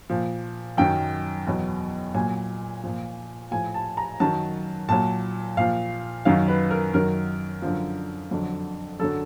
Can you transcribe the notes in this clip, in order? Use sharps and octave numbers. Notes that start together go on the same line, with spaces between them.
A#2 F3
F#2 D#3 F#3 G5
E2 B2 F#3
A#2 F#3 G#5
A#2 F3
A2 F3 G#5
A5
A#5
F#2 D#3 F#3 A5
A#2 F#3 A5
A#2 F3 F5
F#2 D#3 F#3 F5
B4
A#4
F#2 D#3 F#3 A#4
F#2 D3 F3
F2 D3 F#3
F#2 D3 F#3 A4